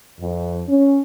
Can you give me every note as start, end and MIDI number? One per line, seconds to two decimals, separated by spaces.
0.21 0.62 41
0.67 0.99 61